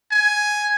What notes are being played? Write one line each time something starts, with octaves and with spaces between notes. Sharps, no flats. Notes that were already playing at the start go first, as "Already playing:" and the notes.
G#5